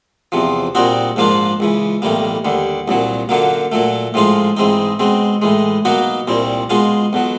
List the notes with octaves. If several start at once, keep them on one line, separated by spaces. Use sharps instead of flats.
E2 C3 F3
A#2 G3 C4 D#4 F#4
G#2 F3 A#3 D4 F4
C#2 C#3 E3
B1 A2 E3 G3 A#3
D#2 D3 G3
C2 A#2 F#3
F#2 D3 F#3 A#3
A#2 F#3 A3
A2 F3 G#3 C#4 F4
G#2 E3 G#3 C4 D#4
B2 G#3 C4
A2 E3 G#3
B2 F#3 A#3 D#4 F#4
C2 A#2 G3 C4
B2 G#3 C#4 F4
B1 B2 F#3